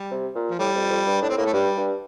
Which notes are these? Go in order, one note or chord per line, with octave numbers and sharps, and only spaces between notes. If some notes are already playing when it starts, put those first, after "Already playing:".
Already playing: G3
C3
A#2
F3
A2 G3
F2
F2
G2
A2 D4
C4
A2 A#3
A3
G2 G3
G2